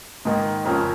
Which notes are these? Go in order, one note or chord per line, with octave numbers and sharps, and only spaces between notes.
G#2 D#3 A#3
F2 C#3 F3 C#4 A#4